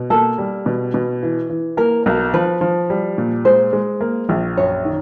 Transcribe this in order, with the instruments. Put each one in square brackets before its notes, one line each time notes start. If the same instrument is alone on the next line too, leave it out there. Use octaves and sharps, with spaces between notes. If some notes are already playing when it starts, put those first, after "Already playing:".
Already playing: [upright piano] B2
[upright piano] A#3 [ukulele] A4
[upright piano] G3
B2
B2
E3
E3
[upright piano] A#3 [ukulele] A#4
[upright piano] B1 [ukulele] A#4
[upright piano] F3 [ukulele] B4
[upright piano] F3
G3
A#2
[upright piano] G#3 [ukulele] C5
[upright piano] G#3
A#3
A#1
[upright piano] F#2 [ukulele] C#5
[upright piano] D#3